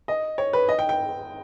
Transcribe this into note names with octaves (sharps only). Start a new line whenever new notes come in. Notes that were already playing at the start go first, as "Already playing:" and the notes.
D#5
C#5
B4
D#5
G5
G5